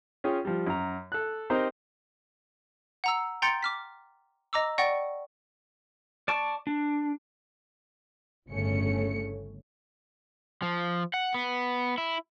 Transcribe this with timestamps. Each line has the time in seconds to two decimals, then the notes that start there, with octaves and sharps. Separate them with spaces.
0.24 C#4 F4 G#4 G5
0.45 F3 G3
0.67 F#2 A#5
1.12 A4 F#6
1.50 C4 D#4 G4 A#4 C5
3.04 F#5 A#5 E6
3.42 G5 A#5 C6 G6 A6 C#7
3.63 D6 F6 B6
4.53 D#5 A#5 D6 E6
4.78 D5 F#5 G5 C#6 A#6
6.28 D5 A5 C#6
6.67 D4
8.49 G1 A2 C#3 A3 C#4 C#7
10.62 F3
11.14 F#5
11.34 B3
11.98 E4